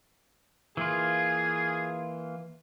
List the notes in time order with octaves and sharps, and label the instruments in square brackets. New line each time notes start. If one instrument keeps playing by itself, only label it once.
[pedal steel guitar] E3 A#3 F4 [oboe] G#4